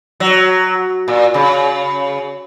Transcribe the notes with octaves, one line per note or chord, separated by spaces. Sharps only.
F#3
A#2
C#3